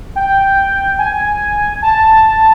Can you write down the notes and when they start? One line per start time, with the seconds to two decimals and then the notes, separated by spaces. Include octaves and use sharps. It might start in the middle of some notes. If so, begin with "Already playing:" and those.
0.16 G5
0.99 G#5
1.82 A5